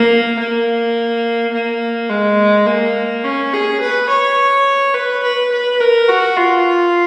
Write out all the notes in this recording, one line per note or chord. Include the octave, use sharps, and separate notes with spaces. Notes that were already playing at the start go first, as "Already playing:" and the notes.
Already playing: A#3
A#3
A#3
G#3
A#3
C#4
G#4
B4
C#5
B4
B4
B4
A#4
F#4
F4